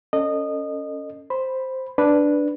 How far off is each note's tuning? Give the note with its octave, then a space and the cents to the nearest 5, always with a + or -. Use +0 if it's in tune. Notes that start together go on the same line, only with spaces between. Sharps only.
C#4 +0 A4 +30 D#5 -20
C5 +0 B5 +0
D4 +0 B4 +0